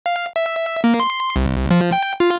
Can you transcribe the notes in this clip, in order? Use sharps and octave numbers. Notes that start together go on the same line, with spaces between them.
F5
E5
A#3
C6
C2
F3
G5
F4